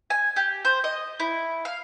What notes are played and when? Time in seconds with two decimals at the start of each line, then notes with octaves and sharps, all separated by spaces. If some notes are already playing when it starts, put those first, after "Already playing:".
0.10 G#5
0.36 G4
0.65 C5
0.84 D#5
1.20 E4
1.65 F5